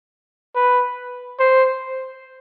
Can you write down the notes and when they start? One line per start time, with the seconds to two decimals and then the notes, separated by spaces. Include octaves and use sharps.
0.55 B4
1.39 C5